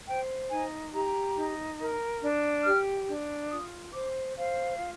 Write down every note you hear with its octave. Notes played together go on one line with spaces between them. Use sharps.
C5 G5
D#4 G#5
G4 A#5
D#4
A#4
D4
G4 F6
D4
F4 D#6
C5 D6
C5 F5
F4